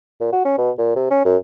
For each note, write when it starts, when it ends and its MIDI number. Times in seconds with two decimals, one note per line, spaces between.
0.21 0.28 46
0.33 0.43 66
0.45 0.55 61
0.58 0.71 47
0.78 0.95 46
0.96 1.09 48
1.11 1.21 61
1.25 1.37 42